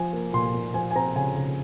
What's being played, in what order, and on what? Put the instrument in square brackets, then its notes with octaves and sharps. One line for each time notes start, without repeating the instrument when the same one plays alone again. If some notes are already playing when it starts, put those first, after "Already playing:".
Already playing: [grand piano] F3 G#5
A#3
A#2 C6
A#2
F3 G#5
G#5
C4 A#5
C#3 G#5
C#3